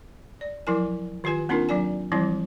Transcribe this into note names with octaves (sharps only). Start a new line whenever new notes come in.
D5
F3 F#3 E4 A#4 G#5
D#3 F4 G4 B4 G#5
A#3 C4 D4 D#4 F4 A#4
F#3 D4 D5 G#5
E3 F3 G3 C4 E4